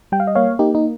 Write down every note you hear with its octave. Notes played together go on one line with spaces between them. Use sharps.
G3 G5
F5
D#5
A#3 C#5 F5
A#3 D#4 G4
D#4